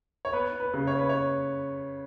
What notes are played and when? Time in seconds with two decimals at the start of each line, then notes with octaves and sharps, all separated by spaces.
0.25 C#5
0.33 B3 B4
0.60 B4
0.74 C#3
0.87 C#5
0.98 B4
1.09 C#5